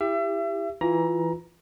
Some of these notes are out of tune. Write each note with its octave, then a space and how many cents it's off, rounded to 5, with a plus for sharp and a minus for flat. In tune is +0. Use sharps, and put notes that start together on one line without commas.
E4 +0 G4 +15 E5 +35
E3 +0 F4 +0 A#5 +20